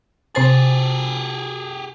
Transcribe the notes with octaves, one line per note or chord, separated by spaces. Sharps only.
C3 G4 G#4 C5 A6